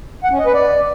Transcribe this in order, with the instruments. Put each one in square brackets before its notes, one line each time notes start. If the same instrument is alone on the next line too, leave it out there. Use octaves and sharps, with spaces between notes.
[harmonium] F#5
C#4
D#5
B4
D5